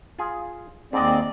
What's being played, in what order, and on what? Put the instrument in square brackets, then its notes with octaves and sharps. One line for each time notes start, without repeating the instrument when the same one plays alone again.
[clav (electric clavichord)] F4 G#4
[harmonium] D#2 D5 [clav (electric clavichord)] G#2 D#5 [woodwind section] C4